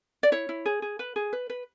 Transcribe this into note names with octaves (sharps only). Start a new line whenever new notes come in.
D5
E4 C#5
E4
G#4
G#4
B4
G#4
B4
B4